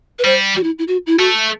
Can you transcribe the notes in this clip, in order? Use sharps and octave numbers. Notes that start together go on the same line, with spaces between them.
B4
G3 C5
F#4
E4
E4
F#4
E4
A3 F#4